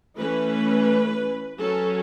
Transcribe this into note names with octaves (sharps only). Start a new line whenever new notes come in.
E3 A3 C#4 B4
F#3 C#4 A4